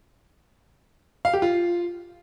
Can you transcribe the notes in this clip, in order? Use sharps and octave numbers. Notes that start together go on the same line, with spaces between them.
F5
G4
F4